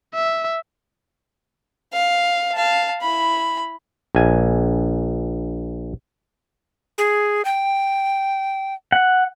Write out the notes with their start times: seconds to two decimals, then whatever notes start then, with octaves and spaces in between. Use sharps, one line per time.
0.15 E5
1.93 F5
2.54 F5 A5
3.01 E4 B5
4.15 A#1 G#5
6.98 G#4
7.45 G5
8.92 F#5